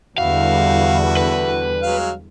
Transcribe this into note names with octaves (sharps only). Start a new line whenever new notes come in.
E2 D3 G3 E4 F#4 F5
B4
F#3 G#3 F5